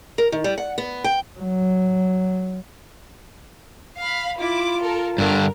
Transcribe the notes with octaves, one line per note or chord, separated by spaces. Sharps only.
A#4
D#3
G3
F#5
B3
G5
F#3
F5 B5
E4 F4 D6
A4 A#4
G2 D3 A#4